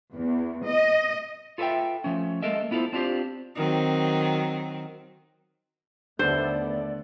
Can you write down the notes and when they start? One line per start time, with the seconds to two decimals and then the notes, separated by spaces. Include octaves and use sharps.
0.14 E2
0.65 D#5
1.58 F4 A4 B4 D5 E5 G5
2.04 F3 A3 C#4
2.42 G#3 A#3 A4 A#4 D#5 E5
2.71 B3 E4 F4 G4 A4 C5
2.93 C4 D4 F4 G4 C5
3.56 D#3 F#3 C4
6.19 D#2 D3 A3 B3 C5 D5